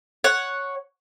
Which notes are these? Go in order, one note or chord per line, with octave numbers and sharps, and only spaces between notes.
C#5 F#5